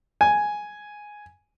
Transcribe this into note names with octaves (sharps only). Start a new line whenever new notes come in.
G#5